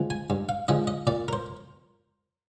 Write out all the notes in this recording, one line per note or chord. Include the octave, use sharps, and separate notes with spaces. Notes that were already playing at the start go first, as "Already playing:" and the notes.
Already playing: D3 F3 G#3
G#5
G2
F5
D3 F3 G#3 D#5
D#5
A#2 D5
A#4
C5